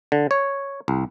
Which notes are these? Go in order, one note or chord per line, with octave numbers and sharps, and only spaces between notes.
D3
C#5
C2